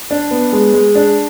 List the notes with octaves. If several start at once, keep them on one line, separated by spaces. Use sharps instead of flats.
D4
B3
G#3
G#3
D4